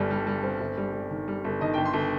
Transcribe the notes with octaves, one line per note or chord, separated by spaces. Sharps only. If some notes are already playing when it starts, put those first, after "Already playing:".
Already playing: G1 G2 G3
G3
G3
C4
G1
G3
G3
D#3
G3
G1
D#3 D#5
G1 G5
C6
G1